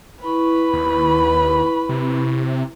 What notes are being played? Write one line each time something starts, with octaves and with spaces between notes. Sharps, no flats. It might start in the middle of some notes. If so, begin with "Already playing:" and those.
E4 B4 B5 C#6
D#2
C3